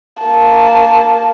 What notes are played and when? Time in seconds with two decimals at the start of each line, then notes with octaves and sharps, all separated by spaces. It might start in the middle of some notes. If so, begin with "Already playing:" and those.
0.23 A#3 A5